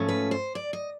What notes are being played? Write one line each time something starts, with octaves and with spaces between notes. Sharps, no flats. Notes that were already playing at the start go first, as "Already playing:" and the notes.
Already playing: G#2 F3 A3 C#4
B4
C5
D5
D#5